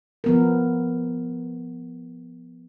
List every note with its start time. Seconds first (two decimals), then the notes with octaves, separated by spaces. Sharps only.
0.24 F3 B3 A#4